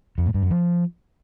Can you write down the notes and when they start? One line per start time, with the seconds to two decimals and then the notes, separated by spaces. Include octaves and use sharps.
0.18 F2
0.26 A2
0.34 G2
0.43 F#2
0.51 F3